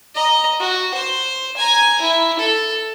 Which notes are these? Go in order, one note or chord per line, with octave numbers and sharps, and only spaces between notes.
D#5 A#5
F#4
C5
G#5 A#5
E4
A4